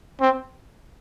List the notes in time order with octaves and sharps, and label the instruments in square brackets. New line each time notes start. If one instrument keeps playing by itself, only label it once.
[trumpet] C4